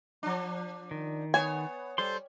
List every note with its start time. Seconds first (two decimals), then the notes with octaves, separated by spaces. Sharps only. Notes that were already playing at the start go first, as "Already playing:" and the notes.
0.23 F3 D4
0.91 D#3
1.34 B3 C#5 G#5
1.98 G3 A4 C5 C6